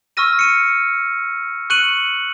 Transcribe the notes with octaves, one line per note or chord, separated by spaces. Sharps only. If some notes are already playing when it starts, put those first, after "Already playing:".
C#6 E6 F6 A#6 D#7
C#7 D#7
C#6 F#6 C#7 D#7 F#7